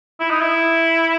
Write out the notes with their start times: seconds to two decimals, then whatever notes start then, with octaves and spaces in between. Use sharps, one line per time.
0.20 E4
0.31 D#4
0.41 E4